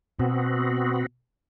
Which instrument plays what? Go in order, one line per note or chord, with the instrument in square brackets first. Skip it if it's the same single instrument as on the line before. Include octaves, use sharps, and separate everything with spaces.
[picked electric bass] B2 [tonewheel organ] B3 C4 F#4